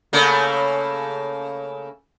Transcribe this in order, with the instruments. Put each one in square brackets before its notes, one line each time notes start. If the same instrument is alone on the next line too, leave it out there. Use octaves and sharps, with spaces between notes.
[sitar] C#3 A3 A#3